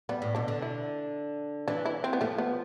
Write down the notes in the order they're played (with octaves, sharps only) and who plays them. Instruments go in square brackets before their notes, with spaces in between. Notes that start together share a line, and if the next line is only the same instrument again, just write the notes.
[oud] G3 [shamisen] B3
[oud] A2
[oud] B2 [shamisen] D4
[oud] D3
[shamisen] E4
[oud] E3 [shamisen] D4
[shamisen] E4
C4
B3
[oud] F3 [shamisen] A3
[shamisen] B3